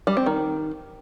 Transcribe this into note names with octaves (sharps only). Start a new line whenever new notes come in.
G3
C4
D#3